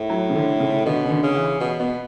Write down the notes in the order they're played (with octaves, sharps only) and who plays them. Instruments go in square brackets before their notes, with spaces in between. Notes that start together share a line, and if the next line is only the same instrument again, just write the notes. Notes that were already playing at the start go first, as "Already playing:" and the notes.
Already playing: [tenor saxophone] A2
[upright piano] F#3
C#3
D3
C#3
[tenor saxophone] B2 [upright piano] D3
[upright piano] C#3
D3
[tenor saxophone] C#3
[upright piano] E3
[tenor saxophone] B2
[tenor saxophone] B2 [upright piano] B3